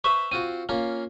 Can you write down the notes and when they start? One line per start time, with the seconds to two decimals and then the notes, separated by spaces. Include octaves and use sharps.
0.04 B4 C5 E5 C#6
0.31 C4 F4 F#4 D#7
0.69 A#3 C#4 F4